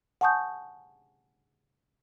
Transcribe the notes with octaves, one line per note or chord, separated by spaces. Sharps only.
F#5 G#5 A5 C#6 D#6 G6